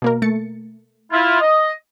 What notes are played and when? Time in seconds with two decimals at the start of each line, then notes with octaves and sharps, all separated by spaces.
0.02 B2 A#3 A#4
0.22 A3 A6 C#7
1.12 E4 F4
1.40 D#5